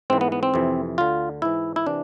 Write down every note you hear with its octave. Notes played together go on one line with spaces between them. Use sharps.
G#2 E3 C4
B3
B3
C4
F2 C3 E3
D2 D3 F4
G#2 E3 E4
E4
C3 E3 D4